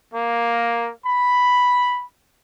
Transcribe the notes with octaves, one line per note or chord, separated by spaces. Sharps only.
A#3
B5